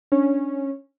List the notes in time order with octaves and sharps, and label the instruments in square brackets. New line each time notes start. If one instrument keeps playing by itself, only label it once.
[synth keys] C#4 [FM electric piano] D4